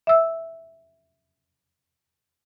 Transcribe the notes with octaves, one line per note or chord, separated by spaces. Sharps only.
E5 E6